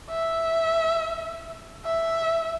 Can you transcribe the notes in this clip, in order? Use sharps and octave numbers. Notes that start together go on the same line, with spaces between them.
E5
E5